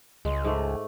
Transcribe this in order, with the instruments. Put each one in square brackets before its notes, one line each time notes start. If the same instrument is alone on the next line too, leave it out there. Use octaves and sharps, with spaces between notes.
[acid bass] C#2 [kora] G#3
[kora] G#2 A3